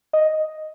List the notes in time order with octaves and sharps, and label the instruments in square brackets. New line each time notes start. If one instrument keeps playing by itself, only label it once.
[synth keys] D#5